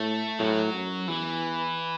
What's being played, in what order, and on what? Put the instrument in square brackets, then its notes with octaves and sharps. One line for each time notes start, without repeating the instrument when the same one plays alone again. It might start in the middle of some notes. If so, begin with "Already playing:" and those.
Already playing: [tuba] A2 [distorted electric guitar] A3
[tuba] A2 [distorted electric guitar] F#3
[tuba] F#2
[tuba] E2 [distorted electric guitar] E3